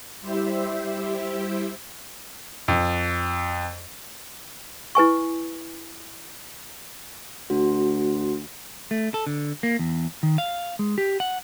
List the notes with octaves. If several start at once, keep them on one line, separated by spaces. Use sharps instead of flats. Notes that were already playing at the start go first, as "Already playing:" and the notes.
G3 E4 G4 C5 E5
F2
E4 B4 G#5 C#6
D2 F#4
A3
A4
D3
A#3
E2
D#3
F5
G#3
G4
F#5